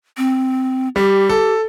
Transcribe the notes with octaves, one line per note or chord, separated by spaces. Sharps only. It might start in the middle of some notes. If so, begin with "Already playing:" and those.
C4
G3 G4
A4